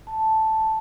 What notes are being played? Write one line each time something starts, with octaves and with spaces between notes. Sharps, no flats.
A5